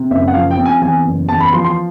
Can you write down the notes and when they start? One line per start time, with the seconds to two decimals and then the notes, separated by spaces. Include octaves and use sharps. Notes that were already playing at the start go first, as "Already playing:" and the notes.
Already playing: C3
0.10 F#1 E5
0.28 F#5
0.34 F3 F5
0.51 G5
0.58 C3
0.66 G#5
0.82 E2 G#5
1.05 F#1
1.29 E2 A5
1.40 B5
1.53 F3 C6
1.64 C6